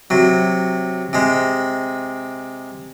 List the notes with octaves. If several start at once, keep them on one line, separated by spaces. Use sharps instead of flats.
C3 F#3
C3 G#3